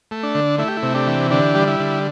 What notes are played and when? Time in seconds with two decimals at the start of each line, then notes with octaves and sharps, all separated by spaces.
0.11 A3
0.23 D4
0.35 D3
0.59 A3 E4
0.68 G4
0.77 E4
0.83 C3
0.95 D4 G4
1.07 E3
1.31 D3 D4 G4
1.55 G3
1.68 E4
1.80 D3